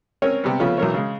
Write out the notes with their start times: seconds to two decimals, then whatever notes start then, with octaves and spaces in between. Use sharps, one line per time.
0.22 C4 C#4 A#4 C#5
0.44 C3 G3 B3
0.60 C#3 F3 A3 B3 C#4
0.78 B1 E3 A#4 C#5
0.94 C#3 G#3